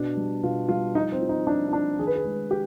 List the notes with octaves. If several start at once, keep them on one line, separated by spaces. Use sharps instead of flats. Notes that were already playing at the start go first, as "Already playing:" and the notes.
Already playing: B2 D4
G3
B2 F4
G3 F4
F3 D#4
C4
F3
D#4
F3 D4
D#4
F3 D4
D#3 G#4
B4
G#4
G#3
G4